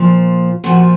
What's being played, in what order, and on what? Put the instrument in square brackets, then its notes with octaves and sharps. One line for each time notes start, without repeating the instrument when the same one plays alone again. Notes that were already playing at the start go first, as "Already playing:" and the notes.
Already playing: [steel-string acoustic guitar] A#2 F3
A#2 F3 F#4